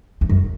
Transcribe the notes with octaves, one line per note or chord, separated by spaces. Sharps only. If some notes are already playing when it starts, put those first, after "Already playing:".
E2
F#2